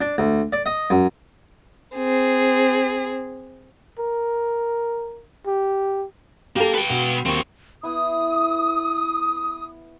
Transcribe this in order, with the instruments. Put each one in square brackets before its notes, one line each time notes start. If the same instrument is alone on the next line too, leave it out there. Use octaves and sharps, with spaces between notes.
[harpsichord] D4
D2
D5
D#5
F#2
[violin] C4 G#4
[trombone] A#4
G4
[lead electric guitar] A#3 A#5 [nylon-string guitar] G4 A4
[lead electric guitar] B4 G5
[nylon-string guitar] B2
[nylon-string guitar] D#2 [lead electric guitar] C4 F#4
[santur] B3 E4 [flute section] D#6